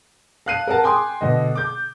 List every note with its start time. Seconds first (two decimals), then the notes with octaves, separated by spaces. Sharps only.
0.46 F5 A5 F#6 C7 D#7
0.67 A#4 F#5 A5
0.84 G5 G#5 C6 D6 D#6
1.21 B2 D3 D#5
1.56 D6 G6